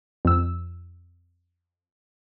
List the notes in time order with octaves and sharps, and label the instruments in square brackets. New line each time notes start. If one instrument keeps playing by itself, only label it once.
[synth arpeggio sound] F2 E6